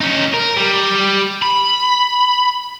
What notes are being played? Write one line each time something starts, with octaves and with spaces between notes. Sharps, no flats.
C#4 D#4
A#4
G3
B5